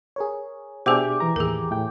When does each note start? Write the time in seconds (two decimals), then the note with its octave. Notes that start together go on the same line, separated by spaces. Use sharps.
0.16 G#4 A#4 C#5
0.86 B2 D4 G4 G#4 C5 E5 G#5
1.20 E3 A#5
1.36 D#2 A2 G#4 A#4
1.71 A2 E3 E4 G5